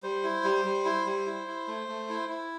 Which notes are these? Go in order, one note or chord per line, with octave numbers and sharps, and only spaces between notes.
G3 C5
E4
G3
G3
E4
G3
E4
E4
A3
A3
E4
E4